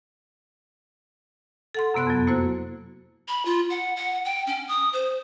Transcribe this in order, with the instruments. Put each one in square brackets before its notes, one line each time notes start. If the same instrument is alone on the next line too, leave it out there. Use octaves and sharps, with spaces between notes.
[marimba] A4 F#5 C6
F#2 C3 B3 C6 F#6
F2 F#3
A#3 E4 F#4 C5
[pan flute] B5
F4
F#5
F#5
G5
C#4
D#6
C5